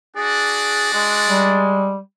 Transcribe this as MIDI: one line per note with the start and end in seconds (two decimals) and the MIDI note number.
0.16 1.63 62
0.16 1.63 66
0.16 0.93 68
0.16 1.63 74
0.94 1.97 56
1.28 1.99 55